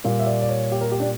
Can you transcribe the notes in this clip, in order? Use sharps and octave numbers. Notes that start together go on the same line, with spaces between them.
A#2 G3 A#3
E5
D5
D5
C#5
G4
A#4
G4
D4